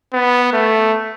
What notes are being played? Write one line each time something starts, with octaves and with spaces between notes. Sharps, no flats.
B3
A3